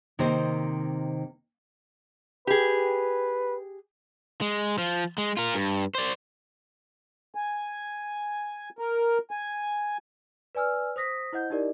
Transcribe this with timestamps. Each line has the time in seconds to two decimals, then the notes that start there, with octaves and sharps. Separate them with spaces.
0.19 C3 D#3 A#3 C4 C5 D#5
2.47 G4 G#4 B4
4.41 G#3
4.78 F3
5.18 G#3
5.37 F4 A#4
5.54 G2
5.95 C5 D5
7.35 G#5
8.79 A#4
9.31 G#5
10.55 B4 D5 G#5 E6 F6
10.96 C5 D#6 A#6 B6
11.33 E4 C5 D#5 F#5 G6
11.50 D#4 E4 G4 A#4 D5 D#5